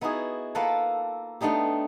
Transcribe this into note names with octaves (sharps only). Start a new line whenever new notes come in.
B3 D#4 E4 F#4 G#4
A#3 F4 A4 B4 F#5 A5
A3 B3 D4 D#4 G4